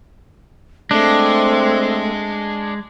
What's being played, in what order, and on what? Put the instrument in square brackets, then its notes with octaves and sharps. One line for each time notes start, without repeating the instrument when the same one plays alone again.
[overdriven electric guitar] G#3 [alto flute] A3 [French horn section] C4 [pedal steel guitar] D4